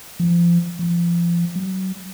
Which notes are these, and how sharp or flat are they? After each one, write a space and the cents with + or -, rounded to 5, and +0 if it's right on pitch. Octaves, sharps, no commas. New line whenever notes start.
F3 -25
F3 -30
F#3 +30